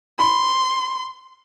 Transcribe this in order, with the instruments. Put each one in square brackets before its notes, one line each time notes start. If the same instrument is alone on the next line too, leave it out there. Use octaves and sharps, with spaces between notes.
[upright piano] B5 [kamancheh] C6